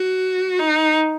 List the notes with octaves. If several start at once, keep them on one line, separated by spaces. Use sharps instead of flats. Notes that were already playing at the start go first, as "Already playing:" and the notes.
Already playing: F#4
D#4